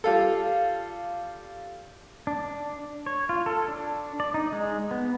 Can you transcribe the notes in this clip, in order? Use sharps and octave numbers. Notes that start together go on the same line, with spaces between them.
G3 F4 A4
D4
C#5
F4
A4
D4
D5
D#4
G#3
B3